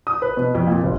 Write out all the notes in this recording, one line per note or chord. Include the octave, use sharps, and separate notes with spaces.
D#6
B4
B2
F2
A#2
G1